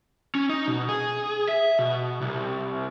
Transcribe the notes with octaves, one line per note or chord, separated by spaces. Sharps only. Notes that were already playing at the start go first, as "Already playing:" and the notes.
C#4
D#4
B2
G#4
E5
B2
C2